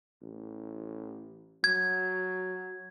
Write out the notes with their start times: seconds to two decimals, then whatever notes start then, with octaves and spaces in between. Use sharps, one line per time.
0.22 A1
1.64 F#3 G#6